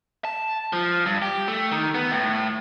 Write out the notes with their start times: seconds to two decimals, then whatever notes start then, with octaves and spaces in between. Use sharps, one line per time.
0.25 A5
0.73 F3
1.06 G2
1.22 G4
1.48 A3
1.72 D#3
1.95 B3
2.12 A2